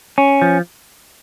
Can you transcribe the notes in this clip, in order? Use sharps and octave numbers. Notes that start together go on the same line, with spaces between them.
C#4
F3